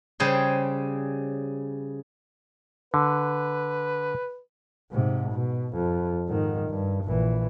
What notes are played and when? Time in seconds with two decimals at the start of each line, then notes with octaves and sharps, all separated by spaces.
0.20 C#3 G3 G#4 C5
2.94 D3 B4
4.91 G#2 C3
5.32 B2
5.74 F2
6.28 G#2 D#3
6.69 G2
7.04 A#1 E3